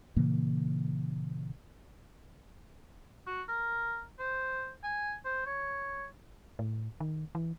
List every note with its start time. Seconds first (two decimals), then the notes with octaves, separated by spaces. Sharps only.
0.16 A#2 C#3 E3 A#3
3.27 F#4
3.48 A#4
4.19 C5
4.83 G#5
5.25 C5
5.46 C#5
6.59 A2
7.00 D#3
7.35 E3